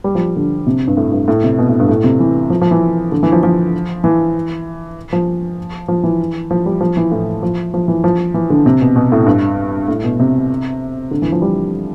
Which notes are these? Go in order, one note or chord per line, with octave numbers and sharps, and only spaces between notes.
G3
F3
D3
C3
G2
A2
G2
A2
C3
B2
A2
G2
A2
C3
E3
F3
F3
E3
D3
E3
F3
F3
E3
F3
F3
E3
F3
G3
F3
E3
A2
F3
F3
E3
F3
E3
D3
C3
B2
B2
A2
G2
A2
B2
C3
D3
E3
F3
G3